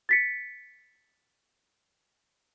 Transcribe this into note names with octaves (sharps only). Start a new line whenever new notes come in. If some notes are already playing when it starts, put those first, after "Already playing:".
A6 B6 C#7